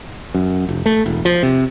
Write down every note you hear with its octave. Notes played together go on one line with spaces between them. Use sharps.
F#2
F1
A3
E1
F3
C3